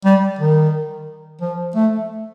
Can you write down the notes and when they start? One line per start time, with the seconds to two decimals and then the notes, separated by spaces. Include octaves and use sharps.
0.05 G3
0.39 D#3
1.41 F3
1.76 A3